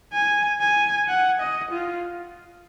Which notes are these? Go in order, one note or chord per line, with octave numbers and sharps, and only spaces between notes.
G#5
G#5
F#5
D#5
F4